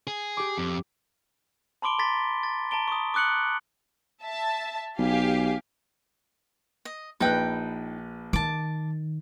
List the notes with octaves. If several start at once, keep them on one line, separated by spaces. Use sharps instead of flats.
G#4
G4 D6
F2
A5 B5 C6 D6 D7 G7
A#5 C6 D6 A6 B6
A6
A5 A#5 D7 G7
C#6 D#6
D6 D#6 F#6 C#7 F#7
E5 A5
B1 G4 F5 G#5
D#5
A#1 D#4 B4 G5 F#6
D#3 A5 D6